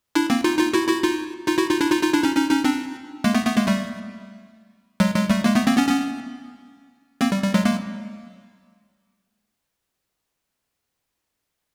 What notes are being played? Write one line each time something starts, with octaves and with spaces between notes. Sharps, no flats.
D4 E4
A#3 C4
D#4 F4
D#4 F4
E4 F#4
E4 F#4
D#4 F4
D#4 F4
E4 F#4
D#4 F4
D4 E4
D#4 F4
D#4 F4
D4 E4
C#4 D#4
C#4 D#4
C#4 D#4
C4 D4
G#3 A#3
A3 B3
A3 B3
G#3 A#3
G3 A3
F#3 G#3
F#3 G#3
G3 A3
G#3 A#3
A3 B3
A#3 C4
B3 C#4
B3 C#4
A#3 C4
G3
G3
F#3 G#3
G#3 A#3